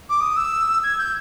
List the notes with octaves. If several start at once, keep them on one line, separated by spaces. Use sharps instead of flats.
D6
D#6
E6
G#6
G6